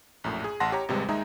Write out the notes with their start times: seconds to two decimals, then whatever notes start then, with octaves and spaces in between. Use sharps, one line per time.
0.24 A#1 F#2 A2
0.44 G#4
0.60 A1 F#5 A5 C6 A#6
0.72 G4 C#5 A#5
0.89 G#1 C3 G3 G#3 B4
1.08 D#2 G#3 D#4 G#4 E5 A#5